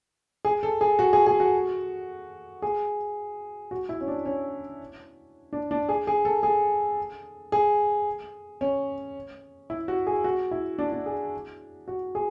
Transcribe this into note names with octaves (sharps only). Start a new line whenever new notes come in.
G#4
A4
G#4
F#4
G#4
G#4
F#4
G#4
F#4
E4
C#4
D4
C#4
D4
D4
G#4
G#4
A4
G#4
G#4
C#4
E4
F#4
G#4
F#4
E4
D4
D4
G#4
F#4
G#4